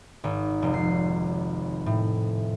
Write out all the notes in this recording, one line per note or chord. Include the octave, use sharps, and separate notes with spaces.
G#1
F1
C7
A2